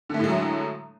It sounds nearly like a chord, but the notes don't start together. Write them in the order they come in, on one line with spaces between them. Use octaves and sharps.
D3 A3 A2 G#3 F#3